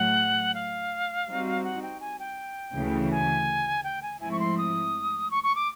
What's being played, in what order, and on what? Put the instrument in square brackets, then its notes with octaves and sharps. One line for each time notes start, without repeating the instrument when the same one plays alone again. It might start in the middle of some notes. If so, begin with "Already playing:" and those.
Already playing: [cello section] A2 F#3 A3 [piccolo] F#5
[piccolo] F5
[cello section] G3 C4 D#4 F#4
[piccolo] F#5
G5
G#5
G5
[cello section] D2 C#3 E3 A3
[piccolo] G#5
G5
G#5
[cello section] G#2 F3 A3 C4 E4 [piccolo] G#5
[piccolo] C#6
C6
D#6
C#6
C#6
D6